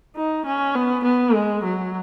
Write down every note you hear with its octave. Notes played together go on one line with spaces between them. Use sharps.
D#4
C#4
B3
B3
G#3
F#3